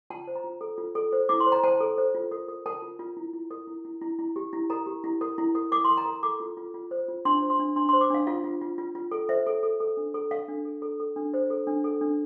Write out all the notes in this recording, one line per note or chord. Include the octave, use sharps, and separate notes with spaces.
F4 A5
C5
A#5
F4
A4
F4
A4
C5
E4 D6
C6
C5
A#5
C5 A5
A4
C5
F4
A#4
A#4
A#4 A5
F4
F4
E4
E4
A#4
E4
E4
E4
E4
G4
E4
A#4 A#5
G4
E4
A#4
E4
A#4
A#4 D6
A#4 C6
A#5
A#4
A4 D6
F4
F4
F4
C5
F4
D4 C6
C5
C6
D4
D4 C6
C5 C6
D6
D4 F5
F4 F5
F4
F4
F4
F4
A4
C5 E5
A4
A4
A4
D4
A4
A4 F5
D4
A4
A4
A4
D4
C5
A4
D4
A4
D4